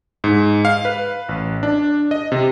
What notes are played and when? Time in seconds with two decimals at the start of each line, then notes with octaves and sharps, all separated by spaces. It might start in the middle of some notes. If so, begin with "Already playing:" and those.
0.24 G#2
0.65 F5
0.85 B4
1.29 A1
1.63 D4
2.11 D#5
2.32 C3